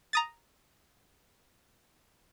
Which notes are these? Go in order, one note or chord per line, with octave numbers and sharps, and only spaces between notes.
A#5 D#6 A6